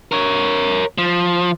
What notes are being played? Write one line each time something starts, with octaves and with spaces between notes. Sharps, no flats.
A#4 C#5
F3